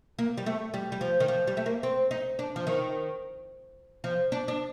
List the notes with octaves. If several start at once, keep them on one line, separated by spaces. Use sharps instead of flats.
A#3
G3
A3
G3
G3
F3
D#3
F3
G3
A3
A#3
C4
D#4
D4
F3
D#3
F3
D4
D4